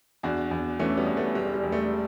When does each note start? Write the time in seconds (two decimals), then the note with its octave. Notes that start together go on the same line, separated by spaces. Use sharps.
0.23 E2 D4 F#4
0.51 E2
0.79 E3 A3 C#4
0.97 G3 B3
1.06 E2
1.17 A3
1.35 E1 G3
1.54 G3
1.63 E1
1.72 A3